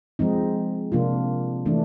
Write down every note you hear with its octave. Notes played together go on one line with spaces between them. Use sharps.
F3 G#3 C4 D#4
C3 F3 A#3 D4 F4
E3 A3 D4